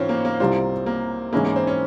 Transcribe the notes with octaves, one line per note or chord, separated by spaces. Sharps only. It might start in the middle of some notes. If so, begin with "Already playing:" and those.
Already playing: G#2 E3 C4 C#4 F4 C5 C#5
A#3
A#3
C2 C3 G3 A#3 C4 F4
A#3
G#2 E3 G#3 A#3 C#4 E4
A#3
C4
C#4